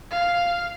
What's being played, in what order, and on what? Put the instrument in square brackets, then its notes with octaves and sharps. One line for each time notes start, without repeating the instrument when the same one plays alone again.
[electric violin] F5